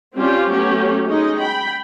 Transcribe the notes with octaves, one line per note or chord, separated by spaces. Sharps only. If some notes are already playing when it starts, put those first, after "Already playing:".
G3 C4 C#4 F4 G4
F#3 A3 B3 C#4 G4
G#3 C#4 D#4 D#5
G5 B5